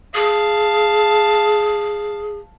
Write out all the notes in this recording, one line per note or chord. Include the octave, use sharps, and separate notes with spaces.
G#4 F5 A5